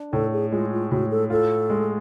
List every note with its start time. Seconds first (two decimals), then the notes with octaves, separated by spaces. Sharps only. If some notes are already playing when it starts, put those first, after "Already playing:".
Already playing: D4
0.13 A2 A4
0.32 G#4
0.51 G#3 F4
0.72 F4
0.91 A2 F#4
1.11 A4
1.30 F4 A4
1.70 G#3